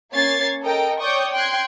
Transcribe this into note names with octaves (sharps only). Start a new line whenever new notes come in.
A#3 C#4 C#5 G#6 A6 C7
A4 A#4 D#5 G5
C#5 D5 G5 C#6 D#6 G6
G5 C6 F#6 G#6